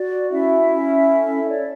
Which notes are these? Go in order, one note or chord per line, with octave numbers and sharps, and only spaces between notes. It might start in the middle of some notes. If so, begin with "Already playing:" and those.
Already playing: F#4 D5
C#4 E4 E5
C#4
A4
C#5 D5